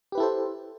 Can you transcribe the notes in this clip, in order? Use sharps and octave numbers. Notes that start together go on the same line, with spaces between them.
E4 G4 A4 B4 C5